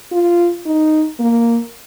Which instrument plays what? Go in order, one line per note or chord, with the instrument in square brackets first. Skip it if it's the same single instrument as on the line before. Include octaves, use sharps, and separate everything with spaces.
[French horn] F4
D#4
A#3